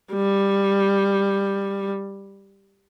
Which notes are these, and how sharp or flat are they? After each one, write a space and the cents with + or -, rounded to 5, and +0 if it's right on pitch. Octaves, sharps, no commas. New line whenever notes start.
G3 +10